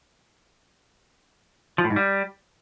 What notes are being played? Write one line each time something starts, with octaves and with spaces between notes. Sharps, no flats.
F3
A2
G#2
G3